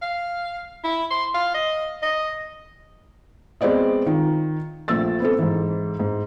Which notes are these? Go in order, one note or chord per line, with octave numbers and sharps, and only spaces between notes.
F5
E4
C6
F5
D#5
D#5
G#3 B3 C4 D5 D#5
D#3 D#4 F4
A#1 F3 A3 E6 A6
B3 C4 A4
G#2 E3
G#2